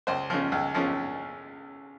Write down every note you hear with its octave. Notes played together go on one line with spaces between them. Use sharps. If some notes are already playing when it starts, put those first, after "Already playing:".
C#2 C5
C#3 F3
C#2
C#3 F3